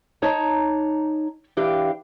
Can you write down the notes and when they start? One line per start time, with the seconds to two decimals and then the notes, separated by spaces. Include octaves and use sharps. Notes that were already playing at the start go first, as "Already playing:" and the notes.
0.22 D#4 C#5 A5 A#5
1.57 E3 D4 G4 F5